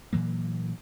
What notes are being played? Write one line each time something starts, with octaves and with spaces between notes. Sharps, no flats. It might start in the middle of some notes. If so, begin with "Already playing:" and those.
A#2 E3 F#3 A#3